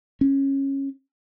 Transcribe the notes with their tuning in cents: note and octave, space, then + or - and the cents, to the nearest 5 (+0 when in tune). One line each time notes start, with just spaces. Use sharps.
C#4 -15